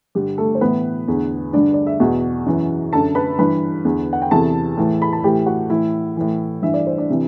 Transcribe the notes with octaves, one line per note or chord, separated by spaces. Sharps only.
G2 D3 G4
A3 A4
C5
A2 E3 B3 B4
E2 D3
G2 D3 D4 D5
D5
E5
E2 B2 F#4 F#5
F#2 E3
F#2 D3 A4 A5
B4 B5
G2 E3 B4 B5
E2 D3
F#5
G5
E2 C3 E3 A4 A5
A2 E3
B5
A5
A2 E3 G4 G5
F#4 F#5
A2 E3 E4 E5
A2 E3
G2 E3 E5
D5
C5
D4 D5
C3 E3